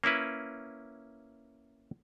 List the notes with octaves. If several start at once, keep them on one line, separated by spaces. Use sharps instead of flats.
A#3 C#4 E4 B4